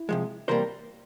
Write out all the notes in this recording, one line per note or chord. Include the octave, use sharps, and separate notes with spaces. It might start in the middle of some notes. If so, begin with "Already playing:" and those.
Already playing: E4
C3 F3 G#3
C3 E3 G3 A#3 A#4 C5